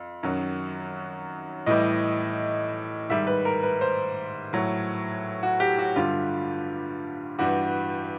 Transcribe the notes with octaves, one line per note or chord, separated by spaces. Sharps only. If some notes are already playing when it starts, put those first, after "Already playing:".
Already playing: F2
F#2 D#3 F#3
A2 E3 G3 D#5
G#2 D#3 G3 E5
B4
A#4
B4
C5
A2 F#3
F#4
G4
F#4
G2 D3 G3 F4
G2 E3 G3 F#4